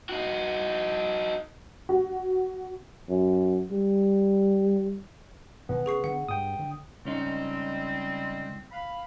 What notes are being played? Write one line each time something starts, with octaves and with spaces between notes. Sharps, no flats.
D#4 F#4
F#4
F#2
G3
E1 D#3 B3
C#3 G#4 C#6 C7
D3 F#5
G2 G5 D#6
D3
C#2 G3 G#3 C4 C#4 D#4
F5 B5